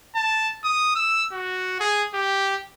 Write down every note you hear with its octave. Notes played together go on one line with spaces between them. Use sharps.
A5
D#6
E6
F#4
G#4
G4